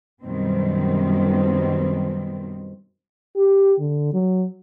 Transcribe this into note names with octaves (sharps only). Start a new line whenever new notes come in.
F#2 B2 D#3 G3 C4
G4
D3
F#3